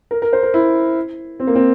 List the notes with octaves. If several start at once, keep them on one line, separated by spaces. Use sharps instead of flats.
A#4
A#4
C5
A#4
E4
C4
A#3
C4